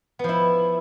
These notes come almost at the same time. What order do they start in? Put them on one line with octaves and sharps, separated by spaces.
B3 F3 E4